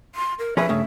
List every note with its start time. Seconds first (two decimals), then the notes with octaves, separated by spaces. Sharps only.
0.15 C6
0.39 A#4
0.57 F3 C#4 G#4 B4 E5
0.69 G2 C#3 A3